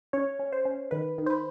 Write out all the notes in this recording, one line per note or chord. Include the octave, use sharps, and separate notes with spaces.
C#4 C#5
C#4
C5
C#4
D#3 B4
D#3
C5
B4